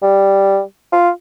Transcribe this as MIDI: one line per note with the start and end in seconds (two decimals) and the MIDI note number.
0.02 0.60 55
0.93 1.10 65